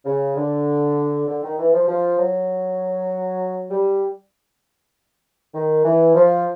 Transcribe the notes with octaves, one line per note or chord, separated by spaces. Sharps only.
C#3
D3
D3
D#3
E3
F3
F3
F#3
G3
D#3
E3
F3